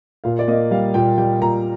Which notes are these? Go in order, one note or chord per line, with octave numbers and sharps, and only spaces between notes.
A#2 F5
D5
A#3 D#5
G3 F5
A#2 G5
G3 G5
A#2 A#5